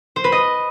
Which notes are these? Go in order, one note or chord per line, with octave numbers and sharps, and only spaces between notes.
C5
B4
D#5